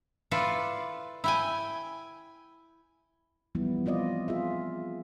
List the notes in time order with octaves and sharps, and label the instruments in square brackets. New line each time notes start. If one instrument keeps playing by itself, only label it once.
[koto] E4 F4 A4 B4 D5
E4 G5 G#5
[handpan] E3 F3 G3 B3 E4
C4 F4 D5 D#5
F4 G#4 E5